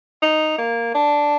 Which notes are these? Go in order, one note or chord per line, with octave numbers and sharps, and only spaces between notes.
D#4
A#3
D4